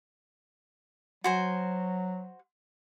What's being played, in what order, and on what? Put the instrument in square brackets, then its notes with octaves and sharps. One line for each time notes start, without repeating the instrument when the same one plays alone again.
[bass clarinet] F#3 [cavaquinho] F#4 C5 G#5